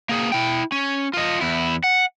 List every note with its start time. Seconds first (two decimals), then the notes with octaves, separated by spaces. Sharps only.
0.09 A#3 G#4
0.32 E4 G5
0.72 C#4
1.14 F4 D#5
1.41 E2 E4
1.84 F#5